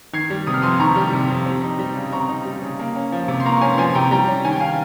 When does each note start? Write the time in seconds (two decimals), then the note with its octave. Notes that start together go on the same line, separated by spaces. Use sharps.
0.13 D#3 G#6 C7
0.30 G3
0.47 C3 D#6
0.54 F6
0.62 F2 C6 D#6
0.80 D#3 A#5 C#6
0.96 G3
1.13 C3
1.30 F2
1.46 C4
1.63 D#4
1.79 G3
1.95 C#3
2.12 C4 A#5 C#6
2.29 D#4
2.45 G3
2.62 C#3
2.80 A#3
2.96 C#4
3.12 F3
3.28 C3
3.40 C6
3.45 A#3 A#5 C#6
3.57 C#6
3.61 C#4 G#5 C6
3.78 F3 G#5 C6
3.94 C3 G5 A#5
4.11 G3 G5 A#5
4.28 C#4
4.45 D#3 G#5
4.53 G5
4.60 F5 G#5